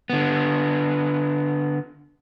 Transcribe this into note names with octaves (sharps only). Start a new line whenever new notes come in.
D3 B3